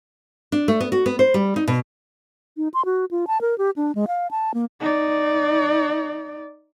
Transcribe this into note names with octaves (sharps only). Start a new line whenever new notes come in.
D4
A3
B3
F#4
B3
C5
G3
D#4
B2
D#4
C6
F#4
F4
A5
A#4
G4
D4
G#3
F5
A5
A#3
D#4 D5